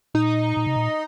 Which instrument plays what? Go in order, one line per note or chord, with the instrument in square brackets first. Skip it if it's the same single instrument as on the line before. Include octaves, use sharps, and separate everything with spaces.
[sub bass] A#2 [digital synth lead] D#4
[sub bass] A#2
C3
A#2